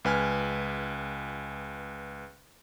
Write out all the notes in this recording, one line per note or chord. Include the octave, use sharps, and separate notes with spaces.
C#2 B4 G#5 F6